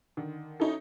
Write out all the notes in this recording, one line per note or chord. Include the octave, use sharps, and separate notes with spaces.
D3 D#3
C#4 D#4 E4 F#4 A4